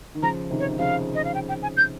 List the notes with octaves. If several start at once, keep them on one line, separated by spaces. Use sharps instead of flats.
D#3
C#3 F3 A#5
C3 D#3
C#5
D#3
C#3 F3 F5
D#5
F5
G5
G5
G#5
G6